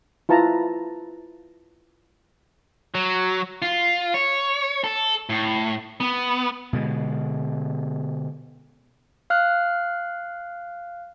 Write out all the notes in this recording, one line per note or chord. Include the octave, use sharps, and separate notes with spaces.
E4 F4 B4 A5 A#5
F#3
F4
C#5
A4
A2
B3
B2 D3 G#3
F5 F6 F#6